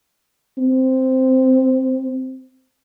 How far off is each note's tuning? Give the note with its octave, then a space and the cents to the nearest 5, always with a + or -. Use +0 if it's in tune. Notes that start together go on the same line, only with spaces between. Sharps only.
C4 -5